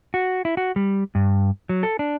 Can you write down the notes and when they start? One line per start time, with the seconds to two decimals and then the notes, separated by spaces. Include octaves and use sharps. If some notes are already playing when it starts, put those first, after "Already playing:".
0.14 F#4
0.45 E4
0.57 F#4
0.76 G3
1.15 G2
1.69 F#3
1.83 A4
1.99 D4